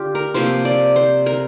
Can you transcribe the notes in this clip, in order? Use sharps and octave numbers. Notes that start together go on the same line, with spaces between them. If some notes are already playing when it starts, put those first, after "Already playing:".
Already playing: D3 F4 G4
A#4
C3 F3 A#3 C5
D5
C5
A#4